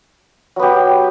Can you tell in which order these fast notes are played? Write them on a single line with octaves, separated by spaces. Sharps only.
F#3 B3 G4